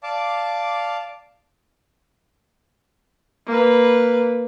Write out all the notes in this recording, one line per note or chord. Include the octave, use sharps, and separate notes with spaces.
D5 F5 A5 D6
A#3 B4